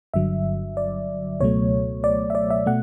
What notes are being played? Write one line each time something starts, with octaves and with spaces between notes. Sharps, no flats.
G1 G2 D3 F#3 E5
D5
C#2 B2 F#3 A3 C#5
D5
E5
D5
E5
B2 A3 F#5